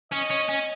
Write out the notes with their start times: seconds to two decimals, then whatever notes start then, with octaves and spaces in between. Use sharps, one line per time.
0.12 C#4 D#5
0.30 C#4
0.49 C#4